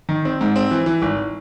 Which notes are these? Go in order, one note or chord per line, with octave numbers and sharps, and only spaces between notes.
D#3
C4
G#2
C4
E3
E3
G#1